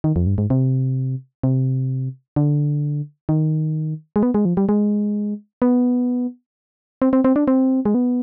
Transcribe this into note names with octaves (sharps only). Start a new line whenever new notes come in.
D#3
F2
G2
G#2
C3
C3
D3
D#3
G#3
B3
G#3
F3
G3
G#3
B3
C4
C4
C4
D4
C4
G#3
B3